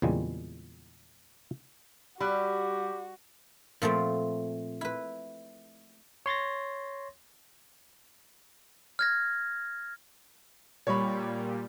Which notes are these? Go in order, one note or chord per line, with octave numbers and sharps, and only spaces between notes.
E2 A#2 C#3 G3 G#3 C4
G3 F#4 G4 B5 F#6
A#2 F3 A3 C4
E4 B4
C#5 C6 A6 A#6
F6 G#6 A#6
A#2 G3 C#5 B5